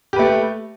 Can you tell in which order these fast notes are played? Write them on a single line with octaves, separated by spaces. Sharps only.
G4 B4 A3